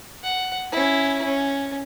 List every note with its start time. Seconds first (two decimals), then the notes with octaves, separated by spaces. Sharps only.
0.24 F#5
0.72 C#4 E4
1.24 C#4